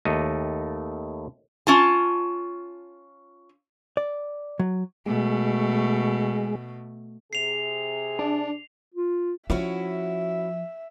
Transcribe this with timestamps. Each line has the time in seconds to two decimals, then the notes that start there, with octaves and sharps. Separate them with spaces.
0.05 D#2 A3 D#5
1.67 C#4 F4 A5
3.97 D5
4.59 F#3
5.06 B2 G#3 A3
7.33 C3 G#4 C7 F7
8.19 D4
8.94 F4
9.50 F3 C#4 E4 F#4 E5